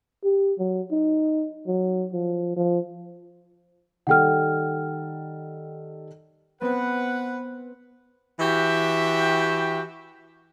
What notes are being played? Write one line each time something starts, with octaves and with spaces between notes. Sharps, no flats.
G4
F#3
D#4
F#3
F3
F3
D#3 G3 A4 F#5 G5 F6
B3 C4 B4 F#5
E3 F#4 G4 E5 G5